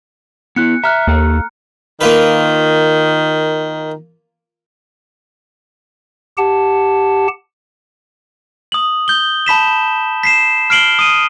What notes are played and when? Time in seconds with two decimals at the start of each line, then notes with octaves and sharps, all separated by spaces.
0.56 B3 E4 F#6 C#7
0.84 E5 A#5 F6 F#6
1.07 D#2 A#3 A4
2.01 D#3 A#3 F4 B4
6.38 G4 F#5 A5
8.72 D#6 F#7
9.08 G6 G7
9.46 A5 B5 B6 E7
10.23 B6 C7 E7
10.70 F6 C7 D7 F#7 G7
10.99 D#6 D#7